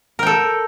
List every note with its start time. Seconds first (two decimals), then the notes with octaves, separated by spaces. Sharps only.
0.19 A#4
0.23 G5
0.27 A4